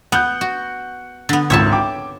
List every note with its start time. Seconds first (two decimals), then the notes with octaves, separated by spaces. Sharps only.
0.12 B3 F#5 F#6 G6
0.41 F#4
1.29 D3 B3
1.50 G#1 C#2 C#5 E5 A5
1.72 G5 D6